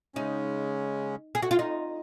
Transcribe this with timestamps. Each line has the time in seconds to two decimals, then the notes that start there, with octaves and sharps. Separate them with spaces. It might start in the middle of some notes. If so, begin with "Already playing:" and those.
0.15 C#3 G#3 C#4 D#4
1.35 G#4
1.43 F#4
1.51 F4
1.59 D#4